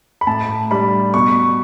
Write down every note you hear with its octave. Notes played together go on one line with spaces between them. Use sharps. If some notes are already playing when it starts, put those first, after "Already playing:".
B5
A2 A5
G3 D4 B5
B2 C#6